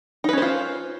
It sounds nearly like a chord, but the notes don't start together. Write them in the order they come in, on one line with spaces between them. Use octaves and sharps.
D#4 B4 C#4 C5 F4